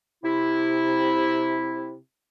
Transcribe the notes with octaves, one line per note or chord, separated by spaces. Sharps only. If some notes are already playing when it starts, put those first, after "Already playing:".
C3 E4